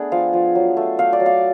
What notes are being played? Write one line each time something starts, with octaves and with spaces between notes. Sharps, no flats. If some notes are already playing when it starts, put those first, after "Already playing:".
Already playing: A3 B3 D4 G#4
F3 F5
F3
F#3
A3
A3 F5
D5
F#3
F5